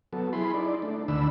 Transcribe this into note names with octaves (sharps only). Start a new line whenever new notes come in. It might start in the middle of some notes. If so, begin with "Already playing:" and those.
F#3 B3 A4
E4 G#4 B5 C6
D#4 E4 D5
A3 D4
D2 D3 D#3 D4 B5 E6